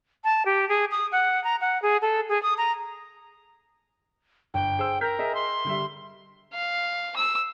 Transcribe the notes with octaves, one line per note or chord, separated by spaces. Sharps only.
A5
G4
G#4
D#6
F#5
A#5
F#5
G#4
A4
G#4
D#6
A#5
G1 G5
G#4 C5 E6
A#4 F6 G6 B6
G#4 D#5 E5
C6
D3 G3 E5
F5
E6